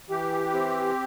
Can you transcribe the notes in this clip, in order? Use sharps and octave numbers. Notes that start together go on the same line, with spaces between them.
E3 G4
C4